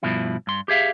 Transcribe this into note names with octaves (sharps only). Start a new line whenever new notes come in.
G2 B2 F3 E4
G2 C6
G4 G#4 E5 F5